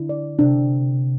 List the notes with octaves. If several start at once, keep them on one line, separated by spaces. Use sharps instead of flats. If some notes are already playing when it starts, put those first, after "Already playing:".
Already playing: D3 E4
D5
C3 D4